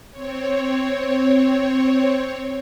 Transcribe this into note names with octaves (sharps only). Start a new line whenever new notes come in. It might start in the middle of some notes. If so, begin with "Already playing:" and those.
C4 C#5